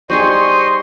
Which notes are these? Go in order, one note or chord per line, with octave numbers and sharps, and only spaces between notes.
G3 D#4 G#4 C5 D#5 C6 C#6